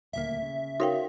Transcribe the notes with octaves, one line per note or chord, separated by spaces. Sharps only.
D#1 D2 A#3 E5
C#3
D#4 F#4 A#4 C#5 F5 G5